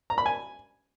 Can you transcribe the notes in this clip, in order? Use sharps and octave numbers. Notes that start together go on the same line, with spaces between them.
A#5
B5
G#5